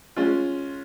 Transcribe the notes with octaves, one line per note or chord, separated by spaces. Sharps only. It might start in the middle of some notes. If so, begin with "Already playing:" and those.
G#3 C#4 F4